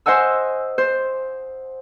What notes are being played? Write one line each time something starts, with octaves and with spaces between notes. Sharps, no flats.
C5 D#5 F#5 G#5 E6
C5